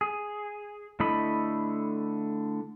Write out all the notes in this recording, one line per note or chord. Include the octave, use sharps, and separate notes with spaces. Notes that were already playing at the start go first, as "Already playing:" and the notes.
G#4
D3 A3 E4 D#5 B5